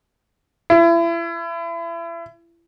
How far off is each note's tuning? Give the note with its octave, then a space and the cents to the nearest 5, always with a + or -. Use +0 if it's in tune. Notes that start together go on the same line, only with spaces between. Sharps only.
E4 +35